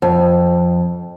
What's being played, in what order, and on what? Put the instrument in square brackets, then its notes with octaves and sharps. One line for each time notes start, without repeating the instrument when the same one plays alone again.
[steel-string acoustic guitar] F2